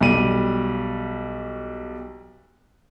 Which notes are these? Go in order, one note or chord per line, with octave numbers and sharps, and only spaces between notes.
B1 G3 D#7